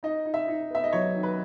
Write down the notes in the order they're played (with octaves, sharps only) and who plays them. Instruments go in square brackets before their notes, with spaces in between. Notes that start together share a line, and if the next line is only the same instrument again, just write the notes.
[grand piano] D#4 [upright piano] D#5
[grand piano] D#4
[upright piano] E5
[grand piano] D#4
[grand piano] B3 [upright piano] E5
[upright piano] D#5
[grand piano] F#3 [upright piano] C#5
[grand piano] D#3
[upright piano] B4